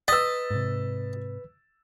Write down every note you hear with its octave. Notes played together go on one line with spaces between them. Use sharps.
B4 D#5 E6 A6 B6
G#2 C3